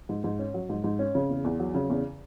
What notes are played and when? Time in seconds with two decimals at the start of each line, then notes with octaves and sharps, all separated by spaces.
0.09 G#2
0.24 G#2
0.39 C#4
0.54 F#3
0.69 G#2
0.84 G#2
0.99 C#4
1.15 C#3
1.29 E2
1.44 E2
1.60 F#3
1.75 C#3
1.90 E2